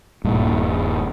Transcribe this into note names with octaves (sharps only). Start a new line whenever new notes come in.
D#1 G2 A#2